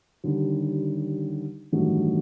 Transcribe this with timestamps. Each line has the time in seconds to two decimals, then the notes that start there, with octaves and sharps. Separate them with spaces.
0.24 D#2 D3 G3
1.72 A1 G2 D#3 F#3 A3